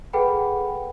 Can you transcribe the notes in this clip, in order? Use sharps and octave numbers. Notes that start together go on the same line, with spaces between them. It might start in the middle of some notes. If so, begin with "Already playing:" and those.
G#4 A4 B4 F#5 G5 B5